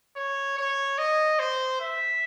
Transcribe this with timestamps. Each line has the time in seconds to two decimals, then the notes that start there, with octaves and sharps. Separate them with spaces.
0.16 C#5
0.57 C#5
0.98 D#5
1.39 C5
1.80 E5